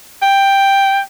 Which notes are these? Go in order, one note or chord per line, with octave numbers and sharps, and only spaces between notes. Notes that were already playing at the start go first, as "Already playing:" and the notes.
G5